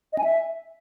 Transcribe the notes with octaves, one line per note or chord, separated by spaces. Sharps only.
D#5
G#5
E5